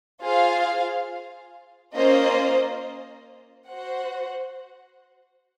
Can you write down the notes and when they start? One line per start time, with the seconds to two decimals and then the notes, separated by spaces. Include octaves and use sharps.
0.21 F4 G#4 C5 F5
1.94 A#3 C#4 F4 C5 D#5
3.67 F#4 C5 F#5